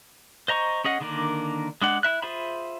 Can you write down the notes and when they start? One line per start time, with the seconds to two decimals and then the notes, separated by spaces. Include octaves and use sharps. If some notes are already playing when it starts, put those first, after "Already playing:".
0.48 C5 D#5 A#5 C#6
0.84 C#4 G#4 D#5 F#5
1.00 D3 D#3 A#3 D4 A#4
1.82 G#3 D4 F#5
2.03 E4 E5 F#6
2.22 F4 G#4 C5 E5 B5